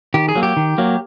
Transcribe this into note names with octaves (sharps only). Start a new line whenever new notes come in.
D#3 G4
G#4
F#3 A#3
G4
D#3
F#3 A#3